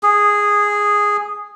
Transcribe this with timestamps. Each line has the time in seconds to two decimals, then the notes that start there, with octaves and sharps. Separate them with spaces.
0.03 G#4